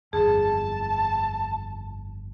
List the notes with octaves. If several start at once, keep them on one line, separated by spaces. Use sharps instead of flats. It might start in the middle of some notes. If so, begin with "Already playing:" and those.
G1 F2 G#4 A5